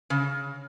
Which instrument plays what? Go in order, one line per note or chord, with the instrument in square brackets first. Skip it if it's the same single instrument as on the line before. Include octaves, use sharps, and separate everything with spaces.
[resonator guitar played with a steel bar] C#3